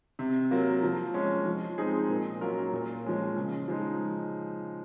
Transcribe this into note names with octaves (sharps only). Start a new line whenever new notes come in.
C3
F#3 A#3 F4
F3
G#3 C#4
F3
G#3 C4 D#4 G#4
A#2
F#3 C#4 F4 A#4
A#2
F3 G#3 C#4
C#3
F3 G#3 D#4